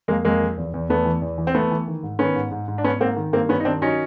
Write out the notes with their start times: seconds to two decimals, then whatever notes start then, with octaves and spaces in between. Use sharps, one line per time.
0.08 F2 G#3 A#3
0.25 F2 G#3 A#3
0.41 F3
0.57 E2
0.74 E2
0.89 E2 A3 B3
1.05 E3
1.22 E2
1.38 E3
1.47 C4
1.55 E3 A3 B3
1.71 E3
1.88 D#3
2.03 G#2
2.19 D#3 B3 C#4
2.36 G#2
2.51 G#2
2.68 G#2
2.78 D4
2.84 G#2 B3 C#4
3.00 G#2 A#3 C4
3.16 D#3
3.33 G2 A#3 C4
3.49 G2 B3 C#4
3.60 D#4
3.65 D#3 C4 D4
3.82 F#3 C#4 D#4